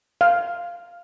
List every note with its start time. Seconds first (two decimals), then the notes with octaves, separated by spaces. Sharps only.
0.21 F5